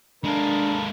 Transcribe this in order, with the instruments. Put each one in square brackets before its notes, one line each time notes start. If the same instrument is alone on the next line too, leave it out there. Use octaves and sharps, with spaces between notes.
[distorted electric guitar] G#3 A#3 [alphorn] D4 [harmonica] A4 A#4 B5